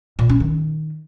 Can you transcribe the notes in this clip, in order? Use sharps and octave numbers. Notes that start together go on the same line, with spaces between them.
A#2
C#4
D#3